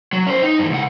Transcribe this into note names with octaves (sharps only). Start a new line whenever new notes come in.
F#3
C#4 C5
D#4
G2 E3
C#2 F#5